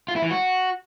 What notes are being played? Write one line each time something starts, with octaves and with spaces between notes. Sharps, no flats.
F4
E4
E3
F#4